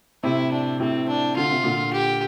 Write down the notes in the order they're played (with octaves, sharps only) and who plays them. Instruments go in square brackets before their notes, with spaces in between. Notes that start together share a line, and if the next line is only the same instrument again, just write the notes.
[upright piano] A2 C3 [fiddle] E4
[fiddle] D4
[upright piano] A2 C3 [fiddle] C4
[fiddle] D4
[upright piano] D3 [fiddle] F4
[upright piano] C3
A#2 D3
[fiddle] G4